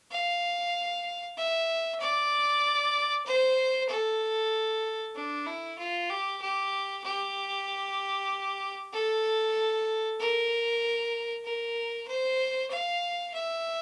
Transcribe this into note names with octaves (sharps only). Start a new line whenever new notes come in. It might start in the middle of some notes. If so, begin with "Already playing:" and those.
F5
E5
D5
C5
A4
D4
E4
F4
G4
G4
G4
A4
A#4
A#4
C5
F5
E5